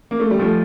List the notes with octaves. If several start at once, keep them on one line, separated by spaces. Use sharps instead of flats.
A#3
A3
G3
F3 A3